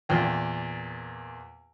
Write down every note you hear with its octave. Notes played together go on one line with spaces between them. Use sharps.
E2 A#2 G5